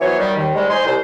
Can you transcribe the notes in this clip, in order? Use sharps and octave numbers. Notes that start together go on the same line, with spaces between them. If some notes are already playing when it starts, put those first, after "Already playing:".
E3 F#3 B3 F#4 C5 C#5
D#3 G3
D#2 D#3
G#2 G3 G#3
D#4 C5 C#5 G#5 C6
C2 C5